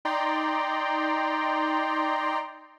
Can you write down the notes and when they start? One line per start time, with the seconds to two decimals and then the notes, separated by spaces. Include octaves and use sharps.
0.05 D#4 D5 G5 A#5 C6